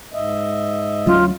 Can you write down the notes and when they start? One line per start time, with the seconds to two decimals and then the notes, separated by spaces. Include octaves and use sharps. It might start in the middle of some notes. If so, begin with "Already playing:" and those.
0.13 G#2 D#5 E5
1.06 D2 F#3 C#4 F4